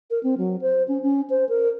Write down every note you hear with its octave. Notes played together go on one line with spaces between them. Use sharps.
A#4
C4
F#3
C5
C#4
C#4
C5
A#4